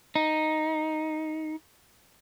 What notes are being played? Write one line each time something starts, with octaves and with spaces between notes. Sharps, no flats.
D#4